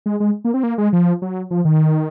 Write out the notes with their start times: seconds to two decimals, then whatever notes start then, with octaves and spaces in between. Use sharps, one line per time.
0.06 G#3
0.20 G#3
0.45 A#3
0.54 C4
0.63 A#3
0.78 G#3
0.93 F3
1.22 F#3
1.51 F3
1.65 D#3